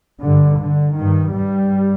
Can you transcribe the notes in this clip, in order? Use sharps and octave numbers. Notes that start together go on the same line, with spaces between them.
G2 D3
D3
G2 D#3
G2 G3